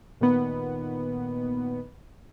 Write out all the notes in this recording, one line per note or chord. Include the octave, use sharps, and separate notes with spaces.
A#2 D#3 B3